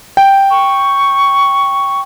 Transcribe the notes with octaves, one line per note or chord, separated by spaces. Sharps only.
G5
C#6